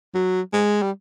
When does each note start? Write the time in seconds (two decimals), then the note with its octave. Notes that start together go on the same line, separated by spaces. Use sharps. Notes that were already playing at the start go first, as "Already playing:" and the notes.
0.15 F#3
0.53 G#3
0.82 G3